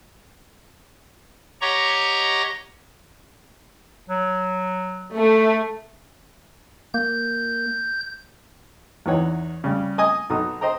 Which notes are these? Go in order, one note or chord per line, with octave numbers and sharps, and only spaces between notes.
G4 C#5 D#5 F#5 A#5 C#6
F#3
A3
A#3 G6
E2 E3 D#4 C#5 F#5
C#3 G3
D#5 G#5 D#6
B1 D#4 A4 D#6
C5 D#5 G5 A#5